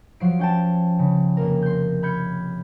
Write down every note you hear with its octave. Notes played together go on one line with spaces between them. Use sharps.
F3 F#3 C7 D7
C#4 G5 A5
C#3
F1 A#3 A#4
C6 G6
B5 F6 G6 G#6 C#7